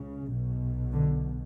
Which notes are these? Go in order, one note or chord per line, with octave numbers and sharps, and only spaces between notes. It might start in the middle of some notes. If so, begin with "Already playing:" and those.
Already playing: C#2 C#3
B1 B2
D3